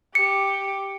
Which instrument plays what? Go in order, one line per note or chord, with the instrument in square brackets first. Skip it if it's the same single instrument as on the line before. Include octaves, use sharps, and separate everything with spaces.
[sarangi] G4 [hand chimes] C#7